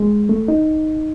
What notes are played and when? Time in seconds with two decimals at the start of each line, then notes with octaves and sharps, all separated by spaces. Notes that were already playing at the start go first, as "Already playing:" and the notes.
Already playing: G#3
0.29 A3
0.48 D#4